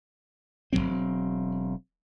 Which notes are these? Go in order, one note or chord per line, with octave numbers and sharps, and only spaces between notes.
E1 G2 F#3 C4